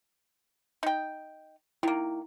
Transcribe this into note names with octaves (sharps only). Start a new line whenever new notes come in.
D#4 G5
D#3 A#3 E4